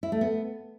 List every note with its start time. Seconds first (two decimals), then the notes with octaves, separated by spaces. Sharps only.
0.03 E4
0.12 A3
0.21 B3